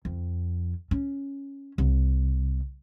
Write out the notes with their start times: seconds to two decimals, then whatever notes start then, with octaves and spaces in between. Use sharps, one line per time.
0.05 F2
0.91 C#4
1.78 C2